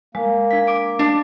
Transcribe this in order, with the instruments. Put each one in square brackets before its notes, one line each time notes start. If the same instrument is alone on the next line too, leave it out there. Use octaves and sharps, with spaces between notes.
[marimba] G#3 [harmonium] A#3
[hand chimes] D4 B6
D6 D7
[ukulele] D4